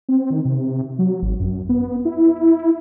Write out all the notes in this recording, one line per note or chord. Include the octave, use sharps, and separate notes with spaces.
C4
D#3
C3
F#3
G#1
F#2
B3
E4